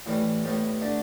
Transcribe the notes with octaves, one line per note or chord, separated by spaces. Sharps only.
A2 E3 G3
A2 G3 B3
D3 A3 D4